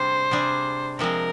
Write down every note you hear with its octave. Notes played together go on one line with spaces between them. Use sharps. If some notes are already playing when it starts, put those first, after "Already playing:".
Already playing: C3 G3 D4 G#4 C5
C3 G3 D4 G#4
C3 F3 G#3 C4 A#4